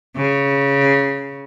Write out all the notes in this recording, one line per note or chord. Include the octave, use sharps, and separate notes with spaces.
C#3